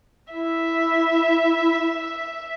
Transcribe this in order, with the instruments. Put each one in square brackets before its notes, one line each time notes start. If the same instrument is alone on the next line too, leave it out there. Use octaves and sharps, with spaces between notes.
[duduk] E4 [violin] E5